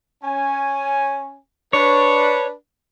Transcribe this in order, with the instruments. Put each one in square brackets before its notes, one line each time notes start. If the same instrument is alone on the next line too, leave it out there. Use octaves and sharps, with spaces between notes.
[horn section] C#4 G#5
[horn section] D4 B4 [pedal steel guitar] C#5